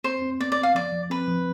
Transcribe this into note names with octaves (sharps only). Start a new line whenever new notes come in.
C4 C5
C4
B3 D5
D5
B3
F5
F3 D5
F3
C4 B4
F3